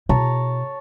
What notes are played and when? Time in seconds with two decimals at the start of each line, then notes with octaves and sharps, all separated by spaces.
0.09 B2 E4 C#5 A5 A#5